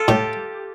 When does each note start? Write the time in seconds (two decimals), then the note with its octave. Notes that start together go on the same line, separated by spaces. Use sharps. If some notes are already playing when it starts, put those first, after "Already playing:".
Already playing: F4 A4
0.08 A2 G4